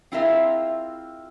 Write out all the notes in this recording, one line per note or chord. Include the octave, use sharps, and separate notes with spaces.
C4 E4 F4 G#4 A#4 E5